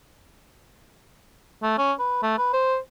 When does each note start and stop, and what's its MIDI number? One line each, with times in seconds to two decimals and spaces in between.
1.63 1.77 57
1.78 1.93 61
1.99 2.21 71
2.23 2.37 57
2.38 2.52 71
2.53 2.77 72